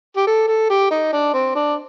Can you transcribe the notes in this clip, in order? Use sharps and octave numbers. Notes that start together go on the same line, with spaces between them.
G4
A4
A4
G4
D#4
D4
C4
D4